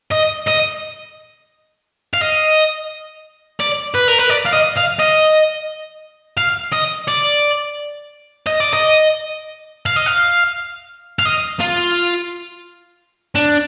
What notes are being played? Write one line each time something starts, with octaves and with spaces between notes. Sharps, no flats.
D#5
D#5
F5
D#5
D5
B4
A#4
B4
D5
F5
D#5
F5
D#5
F5
D#5
D5
D#5
D5
D#5
F5
D#5
F5
F5
D#5
F4
D4